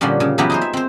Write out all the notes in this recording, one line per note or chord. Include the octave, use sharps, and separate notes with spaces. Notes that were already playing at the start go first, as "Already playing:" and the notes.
A#2 D3 F3 G3 C#4
C#3
C#3 E3 F#3 B3 E4 G4
D#4 G#4 C5
E5
C4 C5